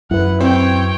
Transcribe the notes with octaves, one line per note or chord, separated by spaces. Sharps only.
F#2 E4 B4 F#5
C4 C#5 G5